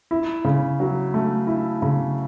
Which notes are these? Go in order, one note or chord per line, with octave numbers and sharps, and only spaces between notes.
E4
C#3
F#3
A3
E4
C#3